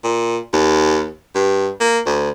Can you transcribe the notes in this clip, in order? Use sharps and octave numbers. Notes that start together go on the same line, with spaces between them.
A#2
D#2
G2
A#3
D2